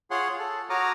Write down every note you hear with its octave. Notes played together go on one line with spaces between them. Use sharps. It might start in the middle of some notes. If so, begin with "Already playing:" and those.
F4 G#4 C#5 F#5 C6
A4
F#4 C#5 A#5 D6 D#6 F6